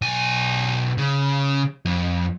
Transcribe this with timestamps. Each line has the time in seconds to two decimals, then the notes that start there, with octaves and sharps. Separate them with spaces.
0.02 B1 G#5
0.98 C#3
1.85 F2